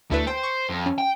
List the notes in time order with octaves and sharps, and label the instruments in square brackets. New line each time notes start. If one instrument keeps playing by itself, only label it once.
[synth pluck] D2 E4 B4 [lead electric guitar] A3
[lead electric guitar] C5 [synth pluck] G5
[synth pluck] C#6
[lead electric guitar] F2
[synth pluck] C#4
[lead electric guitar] G5